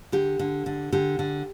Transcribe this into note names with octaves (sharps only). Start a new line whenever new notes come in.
D3 G4
D3
D3
D3 G4
D3